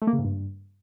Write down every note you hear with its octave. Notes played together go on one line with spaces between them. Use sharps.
A3
A#3
C#3
G#2
G2